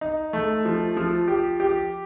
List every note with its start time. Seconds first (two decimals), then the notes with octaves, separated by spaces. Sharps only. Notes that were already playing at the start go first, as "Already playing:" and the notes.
0.01 D#4
0.33 A3
0.65 F3
0.97 F3
1.28 G4
1.60 G4